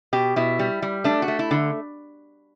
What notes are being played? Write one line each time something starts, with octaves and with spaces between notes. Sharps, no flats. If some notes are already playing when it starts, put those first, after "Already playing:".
B2 G4
B2 E4
G3
G3
A3 D4
F#4
A3
E4
D3